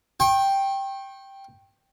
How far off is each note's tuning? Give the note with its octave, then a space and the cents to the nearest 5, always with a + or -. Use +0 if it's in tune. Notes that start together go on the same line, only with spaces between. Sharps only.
G5 +0 C#6 -40